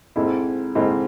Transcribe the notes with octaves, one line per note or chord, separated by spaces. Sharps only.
G#2 G#3 C4 E4 A4
G#2 G#3 C4 E4 A4